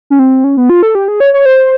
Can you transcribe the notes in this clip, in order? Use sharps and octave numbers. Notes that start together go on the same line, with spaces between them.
C#4
C4
C#4
B3
F4
A4
G4
G#4
C#5
C#5
C5